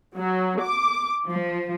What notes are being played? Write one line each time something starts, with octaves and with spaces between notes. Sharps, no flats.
F#3
D6
F3